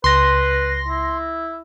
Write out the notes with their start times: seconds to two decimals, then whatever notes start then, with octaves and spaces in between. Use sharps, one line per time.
0.04 C#2 B4 C6 A#6
0.88 E4